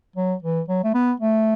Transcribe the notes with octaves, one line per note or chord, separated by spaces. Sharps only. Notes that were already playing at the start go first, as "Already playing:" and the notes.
F#3
E3
F#3
A3
B3
A3